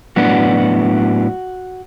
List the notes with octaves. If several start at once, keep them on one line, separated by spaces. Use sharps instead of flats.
A2 F#3 B3 D4 F#4